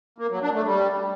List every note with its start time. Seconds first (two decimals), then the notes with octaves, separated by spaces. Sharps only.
0.18 A#3
0.30 F#3
0.42 D4
0.54 A3
0.66 G3